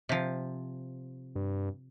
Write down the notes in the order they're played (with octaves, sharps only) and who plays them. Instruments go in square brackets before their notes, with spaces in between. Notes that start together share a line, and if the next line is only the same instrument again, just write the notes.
[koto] C3 F3
[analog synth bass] G2